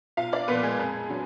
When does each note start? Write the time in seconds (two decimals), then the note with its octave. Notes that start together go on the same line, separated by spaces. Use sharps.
0.17 B1 F4 F5
0.33 D4 D5
0.48 A#2 F3 B3 B4
0.63 G#3 G#4
0.79 F2
1.09 D3 F#3